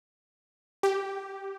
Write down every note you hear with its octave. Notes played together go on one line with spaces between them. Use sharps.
G4